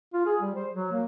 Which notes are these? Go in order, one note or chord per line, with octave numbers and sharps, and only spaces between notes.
F4
G#4
G3
C5
F#3
A#3